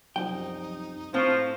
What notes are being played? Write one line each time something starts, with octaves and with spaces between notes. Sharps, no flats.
C2 F#2 F3 D#4 G5
A2 F3 C4 C#6 G6 A#6